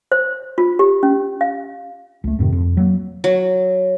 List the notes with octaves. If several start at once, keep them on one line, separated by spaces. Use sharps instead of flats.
C5
F4
G4
C#4
F5
C#2 A3
F2 G#2 C3 D#3
F2
F#3 A#3
F#3